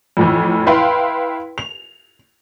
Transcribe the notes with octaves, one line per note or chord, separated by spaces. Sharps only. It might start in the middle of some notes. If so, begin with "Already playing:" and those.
F2 A2 E3
E4 B4 F5 G5 C6
F7